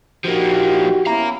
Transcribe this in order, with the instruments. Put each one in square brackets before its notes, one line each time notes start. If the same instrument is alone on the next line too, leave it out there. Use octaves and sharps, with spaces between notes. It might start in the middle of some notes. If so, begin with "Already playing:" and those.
[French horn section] A#2 D#4 F#4 [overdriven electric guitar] F3 A#3 [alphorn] G4
[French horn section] B3 C#4 E4 [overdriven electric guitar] F5 A#5